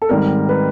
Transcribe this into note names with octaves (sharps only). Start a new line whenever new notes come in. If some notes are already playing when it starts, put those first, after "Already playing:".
A4
G#2 D#3 G3 C4 A#4
B4